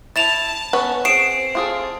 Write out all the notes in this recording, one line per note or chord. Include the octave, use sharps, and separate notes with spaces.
E4 A5 A6 E7 F7
B3 C#4
C4 G#4 C7 D7 E7
F4 G#4 A4